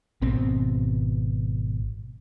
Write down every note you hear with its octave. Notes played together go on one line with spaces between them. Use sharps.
G#1 B2 C4